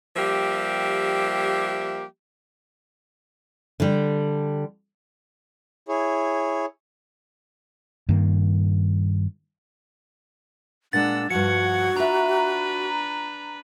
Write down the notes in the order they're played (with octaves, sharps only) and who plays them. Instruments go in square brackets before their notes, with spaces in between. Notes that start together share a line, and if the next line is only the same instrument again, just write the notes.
[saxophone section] F3 G3 A#3 G4 E5
[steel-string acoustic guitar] D3 G3
[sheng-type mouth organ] E4 G#4 C#5
[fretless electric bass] G2 D#3 A#3
[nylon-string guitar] A#2 G#3 [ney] D4 [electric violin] F#5 E6 [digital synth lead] A6
[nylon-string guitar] G2 F3 [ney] F#4 [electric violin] F#5 G#6 [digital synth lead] C#7
[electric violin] D4 B4 [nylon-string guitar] F4 E5 [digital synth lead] A#5